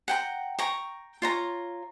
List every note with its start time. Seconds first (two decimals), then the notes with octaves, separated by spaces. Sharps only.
0.08 F#5 G5 A#5
0.59 G5 A#5 C#6
1.22 F4 C#5 A#5